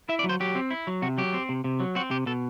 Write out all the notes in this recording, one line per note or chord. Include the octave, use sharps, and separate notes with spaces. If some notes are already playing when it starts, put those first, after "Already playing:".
E4 E5
D5
F#3
C5
F#3 G4
C4
E4
F#3
C3 F#4
F#3 G4
C4
C3
C3
F#3
C4 F#4
C3 G4
B2 A4